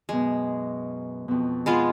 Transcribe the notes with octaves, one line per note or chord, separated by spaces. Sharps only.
F#2 B2 G#3
F2 B2
G#3 B3 F4